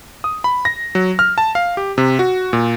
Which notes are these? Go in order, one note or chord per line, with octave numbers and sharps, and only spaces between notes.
D#6
B5
A#6
F#3
F6
A5
F5
G4
C3
F#4
A#2